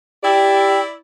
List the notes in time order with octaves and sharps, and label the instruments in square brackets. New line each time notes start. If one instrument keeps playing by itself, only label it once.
[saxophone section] E4 D5 [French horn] G4 [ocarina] G5